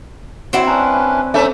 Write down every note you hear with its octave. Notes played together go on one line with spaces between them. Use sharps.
C4 E4 F#4 C#5 D5 F#5
C#4 D4 B4 A#5
A3 C#4 D#4 A4 C5 E5 A#5